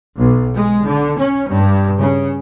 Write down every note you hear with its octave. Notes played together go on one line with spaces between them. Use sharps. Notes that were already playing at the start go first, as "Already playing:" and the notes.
B1
G#3
D3
C#4
G2
C#3